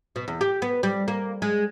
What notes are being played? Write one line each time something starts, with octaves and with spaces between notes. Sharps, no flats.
B2
E2
G4
B3
G3
A#3
G#3